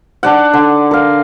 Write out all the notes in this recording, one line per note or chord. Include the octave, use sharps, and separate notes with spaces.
D4 D5 F#5
D3
A#4 F5